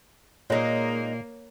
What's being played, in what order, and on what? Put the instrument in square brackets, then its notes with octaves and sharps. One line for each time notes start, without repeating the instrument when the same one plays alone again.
[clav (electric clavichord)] A#2 [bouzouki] G#3 D#4 [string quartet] A#3 [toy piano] C#5